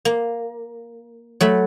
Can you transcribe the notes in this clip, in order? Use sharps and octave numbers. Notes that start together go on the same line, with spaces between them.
A#3
F#3 A3 B5